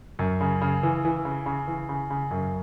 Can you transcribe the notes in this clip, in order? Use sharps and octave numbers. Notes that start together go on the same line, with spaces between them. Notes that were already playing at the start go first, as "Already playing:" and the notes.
F#2
C#3
C#3
E3
E3
C#3
C#3
E3
C#3
C#3
F#2